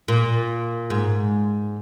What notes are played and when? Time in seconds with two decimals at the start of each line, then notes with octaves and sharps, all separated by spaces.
0.08 A#2
0.90 G#2